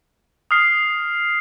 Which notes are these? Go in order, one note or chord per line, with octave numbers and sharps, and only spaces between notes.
D#6 F6 C7